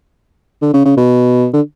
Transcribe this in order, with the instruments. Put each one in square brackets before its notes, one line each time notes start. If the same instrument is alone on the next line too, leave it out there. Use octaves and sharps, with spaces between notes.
[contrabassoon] D3
C#3
C#3
B2
D3